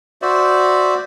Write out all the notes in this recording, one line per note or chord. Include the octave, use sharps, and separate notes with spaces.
F#4 C5 D5 E5